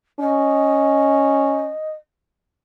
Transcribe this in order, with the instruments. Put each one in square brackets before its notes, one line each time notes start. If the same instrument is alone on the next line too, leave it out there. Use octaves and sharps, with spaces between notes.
[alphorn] C#4 [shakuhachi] D#5